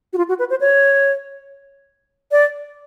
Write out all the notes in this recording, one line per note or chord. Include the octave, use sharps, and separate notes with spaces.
F#4
F4
F#4
B4
C5
C#5
D5